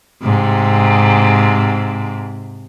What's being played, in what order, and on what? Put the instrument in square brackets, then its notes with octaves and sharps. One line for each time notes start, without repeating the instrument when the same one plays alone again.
[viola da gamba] G#2 C3